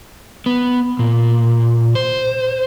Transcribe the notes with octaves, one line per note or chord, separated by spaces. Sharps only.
B3
A#2
C5